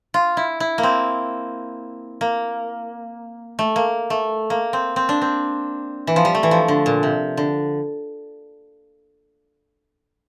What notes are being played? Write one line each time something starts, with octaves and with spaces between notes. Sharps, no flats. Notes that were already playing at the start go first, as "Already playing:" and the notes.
F4
E4
E4
A#3
C4
A#3
A3
A#3
A3
A#3
C4
C4
D4
C4
E3
F3
G3
A3
E3
F3
D3
A#2
C3
D3